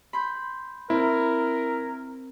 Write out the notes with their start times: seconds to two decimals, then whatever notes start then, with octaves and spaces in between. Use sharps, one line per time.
0.13 B5 C6 G6
0.90 C4 E4 A#4